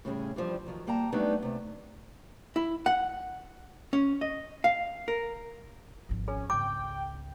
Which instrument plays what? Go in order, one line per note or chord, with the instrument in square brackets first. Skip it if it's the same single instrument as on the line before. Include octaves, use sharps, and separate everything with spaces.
[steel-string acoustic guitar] A2 C#3 G3 C#4 G#4
G2 E3 F3 G3
D#3 F3 F#3
G3 A#3 G5 A5 A#5
F#3 G3 A3 B3 D4 D#4
C3 A3
[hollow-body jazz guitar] E4
F#5
C#4
D#5
F5
A#4
[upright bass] G#1 F3
[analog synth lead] C#4 [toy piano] G#4
[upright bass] G#1 C#2 [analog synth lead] G5 [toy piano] D6